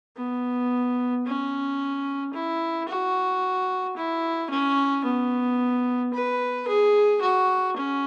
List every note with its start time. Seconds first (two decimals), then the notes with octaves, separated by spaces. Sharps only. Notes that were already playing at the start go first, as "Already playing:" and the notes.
0.17 B3
1.26 C#4
2.34 E4
2.89 F#4
3.97 E4
4.51 C#4
5.05 B3
6.14 B4
6.68 G#4
7.21 F#4
7.77 C#4